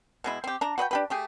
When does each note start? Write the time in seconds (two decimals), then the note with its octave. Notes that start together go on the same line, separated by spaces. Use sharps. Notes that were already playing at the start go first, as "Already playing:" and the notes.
0.24 B2 G#3 E4
0.44 C4 G4
0.61 D4 A#5
0.78 F#4 B4 D#5 G5
0.91 D4 G4 B4
1.10 A3 G4 G#4